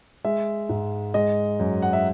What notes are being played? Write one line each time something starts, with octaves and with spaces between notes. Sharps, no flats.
G#3 E5
G#2
G#3 D#5
F#2
F#5
E5